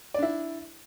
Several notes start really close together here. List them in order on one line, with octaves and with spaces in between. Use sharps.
D5 D4 E4